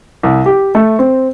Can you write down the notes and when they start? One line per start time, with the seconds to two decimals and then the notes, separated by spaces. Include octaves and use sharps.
0.23 C2
0.46 G4
0.75 A3
0.99 C4